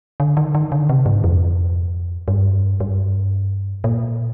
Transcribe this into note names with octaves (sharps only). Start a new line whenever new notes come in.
D3
D#3
D#3
D3
C3
G#2
F2
G2
G2
A#2